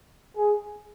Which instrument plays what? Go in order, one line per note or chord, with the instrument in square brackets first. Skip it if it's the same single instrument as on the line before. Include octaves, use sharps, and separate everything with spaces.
[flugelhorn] G#4